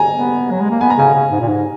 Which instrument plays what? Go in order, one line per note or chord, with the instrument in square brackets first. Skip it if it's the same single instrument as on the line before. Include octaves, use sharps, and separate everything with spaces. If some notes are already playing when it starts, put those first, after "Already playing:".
Already playing: [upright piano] G#5 A#5
[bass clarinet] B3
F#3
G#3
A#3
[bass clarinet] B3 [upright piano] G#5
[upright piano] A#5
[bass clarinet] C#3 [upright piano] G#5
[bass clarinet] C#3
G#2
A#2
G#2